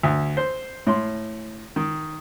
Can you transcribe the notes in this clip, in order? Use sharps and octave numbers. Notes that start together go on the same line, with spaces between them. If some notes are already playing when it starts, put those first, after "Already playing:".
D2
C5
A2 C6
D#3